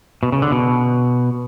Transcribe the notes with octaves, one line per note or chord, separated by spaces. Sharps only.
B2
C#3
D3
B2